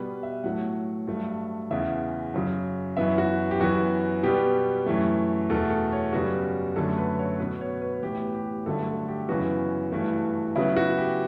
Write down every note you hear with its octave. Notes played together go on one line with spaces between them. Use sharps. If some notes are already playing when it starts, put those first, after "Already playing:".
Already playing: B2 G3 B3 B4
E5
A2 F#3 A3 F#5
G2 F#3 A3
E2 C#3 E3 E5
F#2 C#3 F#3
F#2 E3 B3 E5
F#4
G4
F#2 E3 B3 F#4
B2 G3 B3 G4
F#2 E3 A3
E2 B2 A3 A4
A4
C#5
F#2 C#3 G3 B3 F#4
F#2 D3 F#3 A3 A4
B4
C#5
B2 F#3 B3 B4
C#5
B4
A2 E3 B3 G4
G4
G2 D3 F#3 A3 A4
A4
G4
F#2 C#3 E3 B3 F#4
G2 E3 A3
C#3 F#3 B3 E4
F#4
G4